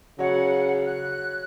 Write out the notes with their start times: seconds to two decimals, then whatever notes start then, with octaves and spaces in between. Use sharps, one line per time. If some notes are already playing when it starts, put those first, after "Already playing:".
0.19 C#3 F#3 C#5 F#5
0.86 F#6